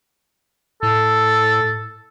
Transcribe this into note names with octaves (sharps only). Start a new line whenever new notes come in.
A2 A4